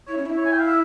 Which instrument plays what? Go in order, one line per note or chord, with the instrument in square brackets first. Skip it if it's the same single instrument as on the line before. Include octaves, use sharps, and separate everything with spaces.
[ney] E4 [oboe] C#5
[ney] C#4
E4
[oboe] C#5
G#5
G5
F5
E5